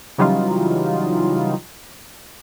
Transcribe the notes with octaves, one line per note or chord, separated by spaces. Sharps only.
C#3 E3 F#3 G3 D#4 F4